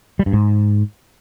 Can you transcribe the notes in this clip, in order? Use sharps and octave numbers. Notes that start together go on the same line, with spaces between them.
G3
G2
G#2